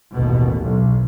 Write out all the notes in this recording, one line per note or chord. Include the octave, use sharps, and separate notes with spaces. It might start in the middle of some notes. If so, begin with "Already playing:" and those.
A1 D#2 B2
B1